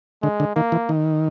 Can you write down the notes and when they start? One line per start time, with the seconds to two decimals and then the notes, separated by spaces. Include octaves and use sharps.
0.23 D3 G#3
0.40 D3
0.56 D#3 A#3
0.72 E3
0.89 D#3